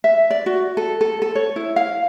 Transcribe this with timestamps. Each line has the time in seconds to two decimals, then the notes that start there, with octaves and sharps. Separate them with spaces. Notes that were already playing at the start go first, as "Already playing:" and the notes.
0.04 E5
0.30 D5
0.46 F#4
0.77 A4
1.01 A4
1.22 A4
1.35 C#5
1.56 E4
1.76 F5